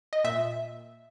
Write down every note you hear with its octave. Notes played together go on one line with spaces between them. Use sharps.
D#5
A#2 E5